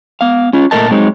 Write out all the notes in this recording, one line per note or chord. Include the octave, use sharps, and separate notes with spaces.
B3 F5
C#4 F4
A#2 A3 C4 A#4 D#5 A5
F#3 G#3 C4 D#4